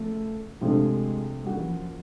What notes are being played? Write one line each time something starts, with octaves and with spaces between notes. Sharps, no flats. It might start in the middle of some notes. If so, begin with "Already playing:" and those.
Already playing: C#3 F3 A3 A#3
C3 F3 G#3 A3 D4
G#3
G3 A#3 C#4 F#4
E3
F3
F3